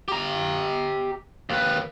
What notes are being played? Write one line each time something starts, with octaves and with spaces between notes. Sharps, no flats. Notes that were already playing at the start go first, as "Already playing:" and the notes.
G4 A#5
D#2 B4